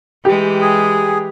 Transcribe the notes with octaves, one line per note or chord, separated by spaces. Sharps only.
E3 G#3 G4
G#4